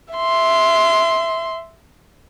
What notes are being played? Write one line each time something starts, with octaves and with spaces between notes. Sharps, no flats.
E5 C6